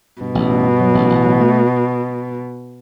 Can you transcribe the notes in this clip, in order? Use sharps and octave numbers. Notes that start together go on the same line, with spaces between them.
G2 B2
A1
G2
G2
F#3
A1
A1
F#3
A3